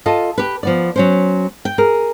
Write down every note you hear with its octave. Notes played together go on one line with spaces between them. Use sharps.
F4 A4 D#5
G4 B4
F3 B3 D5
F#3 C#4 C5
G5
G#4 A#4